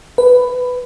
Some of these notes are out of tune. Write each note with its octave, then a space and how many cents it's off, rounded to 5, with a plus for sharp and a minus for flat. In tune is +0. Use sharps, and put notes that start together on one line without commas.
B4 +10